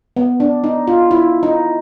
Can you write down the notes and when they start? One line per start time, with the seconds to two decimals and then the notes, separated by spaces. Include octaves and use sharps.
0.17 B3
0.40 D4
0.64 D#4
0.87 F4
1.11 E4
1.43 D#4